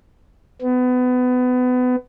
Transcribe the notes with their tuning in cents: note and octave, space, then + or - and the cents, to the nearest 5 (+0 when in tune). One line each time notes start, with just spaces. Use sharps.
B3 +25